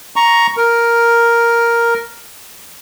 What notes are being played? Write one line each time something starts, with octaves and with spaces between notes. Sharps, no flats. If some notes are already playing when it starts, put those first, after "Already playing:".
A#5 C#6
A#4